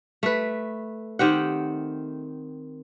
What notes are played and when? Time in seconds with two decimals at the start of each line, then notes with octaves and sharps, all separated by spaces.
0.23 A3 B4
1.19 D#3 C4 G4 F#5